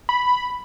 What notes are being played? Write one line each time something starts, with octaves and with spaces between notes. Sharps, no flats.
B5